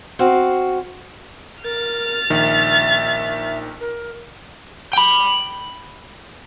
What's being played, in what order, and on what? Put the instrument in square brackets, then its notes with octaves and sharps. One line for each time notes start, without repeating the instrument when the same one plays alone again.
[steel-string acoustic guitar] C4 F#4 F5
[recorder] A#4 [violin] F6 A6
[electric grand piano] A#1 D#3 [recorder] E5
[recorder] A#4
[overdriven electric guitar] G5 B5